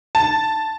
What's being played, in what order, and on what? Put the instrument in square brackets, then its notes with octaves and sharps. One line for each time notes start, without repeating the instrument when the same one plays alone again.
[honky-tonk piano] A5